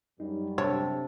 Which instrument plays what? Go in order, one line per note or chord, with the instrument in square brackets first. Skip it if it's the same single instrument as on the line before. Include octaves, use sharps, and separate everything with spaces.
[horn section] F#2 G3 [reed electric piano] D#4
[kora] C3 G4 A4 [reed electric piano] D4 [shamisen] C#5